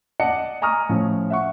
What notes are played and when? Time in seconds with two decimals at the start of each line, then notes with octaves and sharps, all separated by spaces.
0.20 D5 D#5 F#5 A5 D6 C#7
0.62 G#5 A#5 C#6 D#6 F6
0.89 A2 F3 C#4
1.30 E5 F#5 C#6